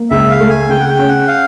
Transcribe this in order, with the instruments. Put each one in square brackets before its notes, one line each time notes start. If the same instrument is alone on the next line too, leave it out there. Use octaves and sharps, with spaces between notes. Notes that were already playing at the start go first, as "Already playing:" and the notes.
Already playing: [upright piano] A#3
[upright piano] C#2 [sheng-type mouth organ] E5
[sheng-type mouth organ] F5
[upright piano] A3
[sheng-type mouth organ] G#5
[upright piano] C#3 [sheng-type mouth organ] G5
[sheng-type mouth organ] F#5
G5
[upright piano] C#4
[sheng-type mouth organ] F#5
F5